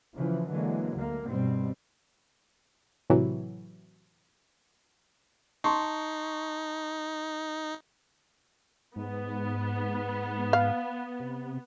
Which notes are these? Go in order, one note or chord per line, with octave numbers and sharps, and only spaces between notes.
C#3 E3 F3
D3 E3 F#3 G#3 A#3
D2 D3 A#3
G2 B2 G3 C4
A2 C3 E3 F#3
D#4 A5 C6 C#6
G#2 B3
F5
C3